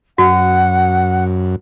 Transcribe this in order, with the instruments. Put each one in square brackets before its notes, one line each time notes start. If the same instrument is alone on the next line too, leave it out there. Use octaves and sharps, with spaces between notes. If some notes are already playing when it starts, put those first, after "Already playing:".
[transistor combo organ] F#2 [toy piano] F#4 [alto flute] F#5